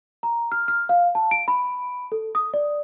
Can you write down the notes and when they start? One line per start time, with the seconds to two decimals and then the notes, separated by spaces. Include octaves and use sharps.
0.23 A#5
0.52 F6
0.68 F6
0.89 F5
1.15 A5
1.31 D7
1.48 B5
2.12 A4
2.35 D#6
2.54 D5